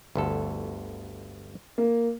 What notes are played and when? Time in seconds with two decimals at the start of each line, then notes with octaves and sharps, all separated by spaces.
0.15 G1 D2 A4
1.78 A#3